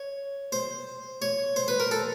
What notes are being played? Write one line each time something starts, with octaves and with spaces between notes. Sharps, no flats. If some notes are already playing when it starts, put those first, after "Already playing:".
Already playing: C#5
C5
C#5
C5
B4
A#4
A4